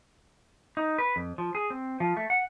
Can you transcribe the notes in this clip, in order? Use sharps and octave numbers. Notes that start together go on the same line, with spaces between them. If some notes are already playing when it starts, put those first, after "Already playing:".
D#4
B4
F2
F3
G#4
C4
F3
A3
F#5